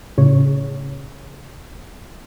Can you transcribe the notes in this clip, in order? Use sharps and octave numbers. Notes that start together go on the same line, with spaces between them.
A2 C#3 C#5